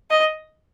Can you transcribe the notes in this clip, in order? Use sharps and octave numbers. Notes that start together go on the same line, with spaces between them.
D#5